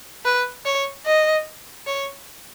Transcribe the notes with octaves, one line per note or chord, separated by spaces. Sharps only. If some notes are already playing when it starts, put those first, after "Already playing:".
B4
C#5
D#5
C#5